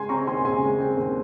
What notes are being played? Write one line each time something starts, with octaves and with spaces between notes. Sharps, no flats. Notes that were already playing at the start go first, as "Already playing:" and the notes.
Already playing: C#3 G#3 G#5 C6
C4 A#5 C#6
D#2 G#5 C6
C#3 G#5 C6
G#3
C4
D#2